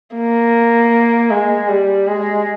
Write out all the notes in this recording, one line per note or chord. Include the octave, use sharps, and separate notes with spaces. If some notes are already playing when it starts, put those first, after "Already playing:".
A#3
G#3
G3
G#3